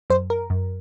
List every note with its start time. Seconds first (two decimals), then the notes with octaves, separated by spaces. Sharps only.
0.10 F#2 C5
0.30 A#4
0.50 F#2